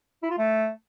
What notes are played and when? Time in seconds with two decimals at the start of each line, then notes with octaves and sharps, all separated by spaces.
0.23 E4
0.30 F4
0.38 A3